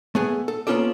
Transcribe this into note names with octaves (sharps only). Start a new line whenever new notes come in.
A3 B3 G#4
A4
A#3 B3 C#4 F4 A4 D5